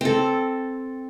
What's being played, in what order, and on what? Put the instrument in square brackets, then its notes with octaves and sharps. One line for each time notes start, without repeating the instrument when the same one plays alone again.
[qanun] C4 A4